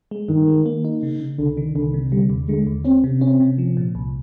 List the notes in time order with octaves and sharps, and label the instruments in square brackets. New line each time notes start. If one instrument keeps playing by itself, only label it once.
[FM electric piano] G#3
[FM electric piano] G2 [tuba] D#3
[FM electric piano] G#3
A#3
D#4
C#3
C#3
[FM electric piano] C2 [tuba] D3
[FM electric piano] D#3
[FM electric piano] C2 [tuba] D3
[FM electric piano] C3
[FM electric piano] D3 [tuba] G3
[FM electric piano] D#2
[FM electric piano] D3 [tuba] G#3
[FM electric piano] D#2
[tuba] C4 [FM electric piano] C#4
[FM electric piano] C3
[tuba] C4 [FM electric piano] C#4
[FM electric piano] C3
F3
A#2
C2